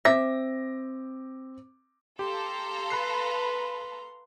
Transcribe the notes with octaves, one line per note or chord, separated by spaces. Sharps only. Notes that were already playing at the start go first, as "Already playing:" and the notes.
C4 E5 D6 A#6
G4 A4 F5 A#5 C6
B4 B5 F#6 C7